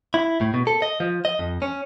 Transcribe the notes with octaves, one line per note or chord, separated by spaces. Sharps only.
E4
A2
B2
A4
D#5
F3
D#5
F2
C#4